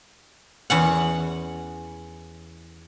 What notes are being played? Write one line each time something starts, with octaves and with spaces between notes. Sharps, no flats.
E2 C#4 F#5